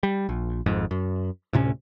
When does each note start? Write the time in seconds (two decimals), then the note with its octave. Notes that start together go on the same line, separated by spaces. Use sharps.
0.03 G3
0.29 A#1
0.66 G#1 F2 G#2
0.91 F#2
1.53 D2 A2 C3 C#4